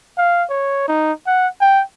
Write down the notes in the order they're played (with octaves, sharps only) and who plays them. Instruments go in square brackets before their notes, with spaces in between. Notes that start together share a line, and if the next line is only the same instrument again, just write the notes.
[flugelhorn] F5
C#5
D#4
F#5
G5